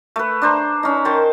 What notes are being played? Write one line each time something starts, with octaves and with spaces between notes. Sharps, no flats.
A3 B4
D4 C5 A#5
C#4 D#4
D#3 C5 A5